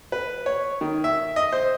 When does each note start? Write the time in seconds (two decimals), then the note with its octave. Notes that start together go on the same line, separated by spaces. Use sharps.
0.12 B4
0.46 C#5
0.81 D#3
1.04 E5
1.36 D#5
1.52 C5